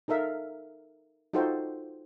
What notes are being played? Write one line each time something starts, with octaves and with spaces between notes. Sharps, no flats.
D#4 A4 A#4 E5 F5
D#4 F4 F#4 A4 C5 G5